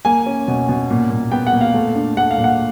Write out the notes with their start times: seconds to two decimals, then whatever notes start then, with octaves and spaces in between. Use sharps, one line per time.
0.05 A#3 G#5
0.26 C#4
0.48 B2
0.69 B2
0.90 A#2
1.10 A#2
1.32 B3 G5
1.47 F#5
1.53 A#2
1.61 F5
1.74 A3
1.95 D4
2.17 A3 F#5
2.31 F5
2.38 A#2
2.44 F#5